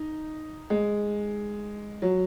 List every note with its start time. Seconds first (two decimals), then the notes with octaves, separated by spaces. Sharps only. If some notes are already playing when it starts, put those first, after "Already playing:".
Already playing: D#4
0.70 G#3
2.02 F#3